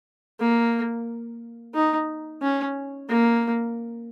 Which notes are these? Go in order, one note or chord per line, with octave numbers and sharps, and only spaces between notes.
A#3
D#4
C#4
A#3